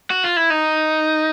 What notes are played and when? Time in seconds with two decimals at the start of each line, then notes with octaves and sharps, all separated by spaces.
0.10 F#4
0.24 F4
0.37 E4
0.50 D#4